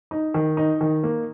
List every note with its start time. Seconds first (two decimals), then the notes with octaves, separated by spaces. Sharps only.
0.11 D#4
0.34 D#3
0.57 D#4
0.81 D#3
1.03 A#3